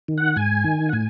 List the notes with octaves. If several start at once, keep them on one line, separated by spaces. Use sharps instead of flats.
D#3
F#5
G#2 G#5
D#3
F#5
A2 G#5